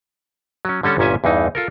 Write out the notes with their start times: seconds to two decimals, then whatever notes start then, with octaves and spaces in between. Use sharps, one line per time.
0.65 F#3 C#4
0.83 D3 G3 C#4 A4
0.98 G1 A#2 C#4 E5 G#5
1.24 E2 G2 E3 D#4
1.55 F4 A4 A#4